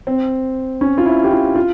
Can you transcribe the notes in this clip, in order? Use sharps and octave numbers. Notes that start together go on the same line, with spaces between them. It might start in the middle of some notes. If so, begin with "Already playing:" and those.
C4
C#4
F4
E4
G4
F4
F4